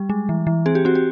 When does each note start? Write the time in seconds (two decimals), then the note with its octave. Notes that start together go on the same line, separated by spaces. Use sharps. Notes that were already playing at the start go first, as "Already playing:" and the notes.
Already playing: G3
0.09 G#3
0.29 E3
0.47 E3
0.66 C4 G#4
0.75 G4
0.85 C4 F#4
0.95 G4